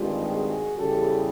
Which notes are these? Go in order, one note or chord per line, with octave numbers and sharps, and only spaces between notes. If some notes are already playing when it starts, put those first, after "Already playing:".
Already playing: G2 D#3 G#3 C4 F4 G4
F#4 G#4
E2 C#3 E3 G3 G4 A4